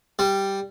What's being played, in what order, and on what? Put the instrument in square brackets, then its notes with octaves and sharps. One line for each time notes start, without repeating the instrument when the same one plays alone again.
[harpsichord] G3